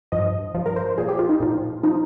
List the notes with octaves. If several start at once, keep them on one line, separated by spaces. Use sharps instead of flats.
G2 F3 D#5
G2 F3
A#4
C5
A#2 F3 G#4
G4
F4
D#4
A#2 F3
F3 D#4